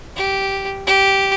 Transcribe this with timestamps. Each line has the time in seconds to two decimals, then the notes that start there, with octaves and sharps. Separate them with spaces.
0.16 G4
0.86 G4